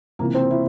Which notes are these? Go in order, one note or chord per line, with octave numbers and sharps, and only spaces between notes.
C#2 C3 E3 A#3
C4
E4